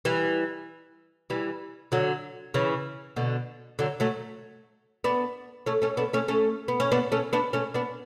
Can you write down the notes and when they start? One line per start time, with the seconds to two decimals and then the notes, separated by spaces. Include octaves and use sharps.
0.05 E3 G3
1.30 E3 G3
1.92 D3 F#3
2.54 C#3 E3
3.16 B2 D3
3.79 D3 F#3
4.00 F#3 A3
5.04 B3 D4
5.66 A3 C#4
5.82 A3 C#4
5.97 B3 D4
6.13 A3 C#4
6.28 A3 C#4
6.68 B3
6.80 C#4
6.92 B3 D4
7.12 A3 C#4
7.33 B3 D4
7.53 A3 C#4
7.74 B3 D4